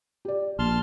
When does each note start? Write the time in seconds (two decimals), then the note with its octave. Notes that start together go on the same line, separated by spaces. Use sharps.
0.25 G4 D5
0.59 A#1 A#3 A5 C6 F6